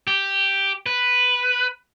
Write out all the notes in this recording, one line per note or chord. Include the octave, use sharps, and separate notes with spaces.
G4
B4